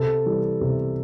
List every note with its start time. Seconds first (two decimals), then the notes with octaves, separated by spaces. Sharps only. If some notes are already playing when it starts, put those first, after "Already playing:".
Already playing: C3 A4
0.26 E3 G3
0.61 C3